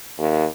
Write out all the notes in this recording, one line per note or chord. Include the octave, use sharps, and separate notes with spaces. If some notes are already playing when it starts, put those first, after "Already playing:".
D#2